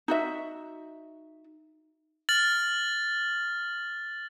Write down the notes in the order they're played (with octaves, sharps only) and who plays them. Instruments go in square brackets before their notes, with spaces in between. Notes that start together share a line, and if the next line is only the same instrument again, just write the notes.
[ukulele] D#4 F#4 E5
[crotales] F6 A6 F#7